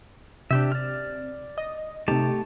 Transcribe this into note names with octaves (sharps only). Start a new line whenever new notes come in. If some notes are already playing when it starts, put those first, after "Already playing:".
C3 D4 G4 E5
D5 F6
D#5
C3 A3 D#4 G4 A5